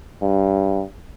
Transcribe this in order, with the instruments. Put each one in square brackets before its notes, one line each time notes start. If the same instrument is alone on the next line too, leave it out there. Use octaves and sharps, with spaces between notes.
[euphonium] G2